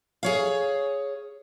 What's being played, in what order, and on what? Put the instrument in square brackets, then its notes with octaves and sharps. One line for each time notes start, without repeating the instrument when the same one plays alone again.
[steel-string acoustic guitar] G#4 C#5 F5